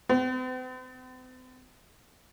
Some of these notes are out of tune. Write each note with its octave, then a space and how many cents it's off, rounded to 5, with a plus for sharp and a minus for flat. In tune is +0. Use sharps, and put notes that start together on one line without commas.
C4 -45